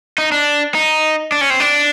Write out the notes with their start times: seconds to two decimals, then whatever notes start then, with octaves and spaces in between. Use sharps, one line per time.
0.18 D#4
0.32 D4
0.75 D#4
1.32 D4
1.41 C#4
1.50 C4
1.60 D4